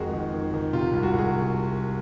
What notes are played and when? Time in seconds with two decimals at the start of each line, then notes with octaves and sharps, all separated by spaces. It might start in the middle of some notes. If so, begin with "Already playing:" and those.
Already playing: F2 D#3 G#3 F#4 G#4 A#4
0.13 D#3
0.34 D#3
0.54 D#3
0.73 C3 F4
0.93 C2
1.03 F#4
1.13 C2
1.18 G#4